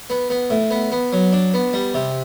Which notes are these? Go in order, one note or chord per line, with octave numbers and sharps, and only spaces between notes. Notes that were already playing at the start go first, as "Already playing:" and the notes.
B3
B3
A2
B3
B3
F#3
D4
B3
G3
C3